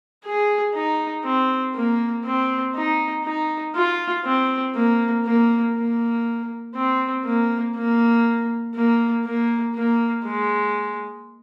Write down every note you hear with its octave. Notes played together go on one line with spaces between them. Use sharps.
G#4
D#4
C4
A#3
C4
D#4
D#4
F4
C4
A#3
A#3
A#3
C4
A#3
A#3
A#3
A#3
A#3
G#3